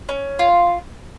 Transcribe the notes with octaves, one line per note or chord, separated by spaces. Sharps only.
C#4
F4